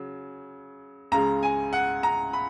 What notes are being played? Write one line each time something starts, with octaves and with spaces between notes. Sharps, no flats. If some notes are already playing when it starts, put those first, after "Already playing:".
Already playing: C#3 F#3
C#2 C#3 G#3 A#5
G#5
F#5
A#5
B5